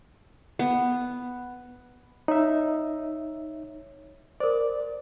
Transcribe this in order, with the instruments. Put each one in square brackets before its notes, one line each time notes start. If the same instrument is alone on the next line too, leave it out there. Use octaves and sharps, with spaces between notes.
[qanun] B3
[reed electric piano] D#4 E5 [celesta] C#5
[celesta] A#4 C5 [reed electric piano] D5